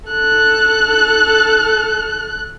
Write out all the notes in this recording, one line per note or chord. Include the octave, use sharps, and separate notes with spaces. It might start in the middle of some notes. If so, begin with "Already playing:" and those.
A4 F#6